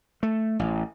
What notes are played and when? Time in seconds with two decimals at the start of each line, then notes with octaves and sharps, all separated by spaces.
0.23 A3
0.59 A1